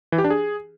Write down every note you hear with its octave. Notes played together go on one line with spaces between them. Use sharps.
E3
G4
D4
G#4